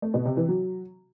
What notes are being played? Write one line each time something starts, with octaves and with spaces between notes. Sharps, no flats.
A3
B2
C3
E3
F#3